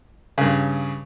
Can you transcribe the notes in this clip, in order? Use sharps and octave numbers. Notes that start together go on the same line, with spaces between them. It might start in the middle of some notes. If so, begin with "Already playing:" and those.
G2 C#3